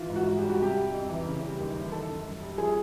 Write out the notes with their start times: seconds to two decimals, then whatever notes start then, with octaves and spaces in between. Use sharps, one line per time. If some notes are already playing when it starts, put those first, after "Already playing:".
Already playing: E3 F4
0.09 G#2
0.16 F#4
0.27 G#2
0.37 G4
0.42 G3
0.49 F#4
0.60 C3 G4
0.76 G3
0.92 F2
1.09 E3
1.25 C#3
1.42 G3
1.59 D#2
1.76 E3
1.92 D#3 A4
2.08 F#2
2.25 F#2
2.41 G3
2.58 F3 G#4